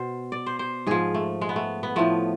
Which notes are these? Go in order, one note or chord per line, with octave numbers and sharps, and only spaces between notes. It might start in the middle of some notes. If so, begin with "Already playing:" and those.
Already playing: B2 C5
D5
C5
C5
G#2 F3 G#4
A3
G#3
B3
A3
B3
A2 F3 A3